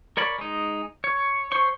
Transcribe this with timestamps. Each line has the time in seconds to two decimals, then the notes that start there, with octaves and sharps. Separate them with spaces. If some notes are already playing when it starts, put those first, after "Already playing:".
0.17 A#4 C#5 D5 B5
0.39 G#3 D#4
1.04 C#5
1.52 C5 C#5 C#6